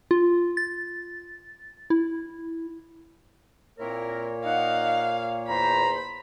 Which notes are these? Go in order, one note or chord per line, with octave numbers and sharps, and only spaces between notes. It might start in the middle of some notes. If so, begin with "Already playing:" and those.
F4
A6
E4
A#2 A#3 C4 E4 A#4 C#5
D#4 F5 F#5
E2 C5 A#5 B5